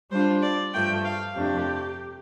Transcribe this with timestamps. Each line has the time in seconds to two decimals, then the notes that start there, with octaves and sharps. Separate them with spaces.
0.11 G3 D4 F4 C5
0.42 D5
0.74 G2 F3 A3 G5
1.05 F5
1.35 F2 C3 A3 D4 G4